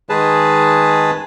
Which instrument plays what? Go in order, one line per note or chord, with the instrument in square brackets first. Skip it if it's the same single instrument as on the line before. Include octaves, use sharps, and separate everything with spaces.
[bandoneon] D#3 G#3 G#4 B4 A5